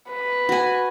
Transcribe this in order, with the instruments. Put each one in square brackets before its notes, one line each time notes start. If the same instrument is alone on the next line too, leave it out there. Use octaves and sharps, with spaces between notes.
[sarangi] B4
[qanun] F#4 G#5